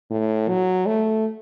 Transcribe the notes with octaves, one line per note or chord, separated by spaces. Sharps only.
A2
F#3
A3